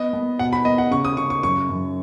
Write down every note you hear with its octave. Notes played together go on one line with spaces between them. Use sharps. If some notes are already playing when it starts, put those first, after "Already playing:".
Already playing: B3 D#5
B3
B2 F#5
B5
B3 D#5
F#5
C#3 C#6
D#6
C#3 C#6
C#6
F#2 C#6
F#2